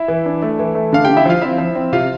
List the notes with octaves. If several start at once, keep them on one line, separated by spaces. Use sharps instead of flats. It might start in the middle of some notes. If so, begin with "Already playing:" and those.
Already playing: E4 E5
E3
D4
A3
E3
A3
D3 F5
D3 G4 G5
E4 E5
F3 F4 F5
C4 E4 E5
F3
C4
C3 F4 F5